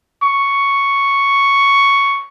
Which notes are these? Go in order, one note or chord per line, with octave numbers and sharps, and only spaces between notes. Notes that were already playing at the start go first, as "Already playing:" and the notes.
C#6